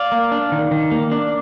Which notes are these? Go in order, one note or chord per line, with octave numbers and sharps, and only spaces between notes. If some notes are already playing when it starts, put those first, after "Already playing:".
Already playing: D5 F5
A#3
D4
D#3
D#3
A#3
D4